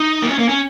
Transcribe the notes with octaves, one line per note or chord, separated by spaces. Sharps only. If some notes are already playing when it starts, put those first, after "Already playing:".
Already playing: D#4
A#3
C#4
A#3
C#4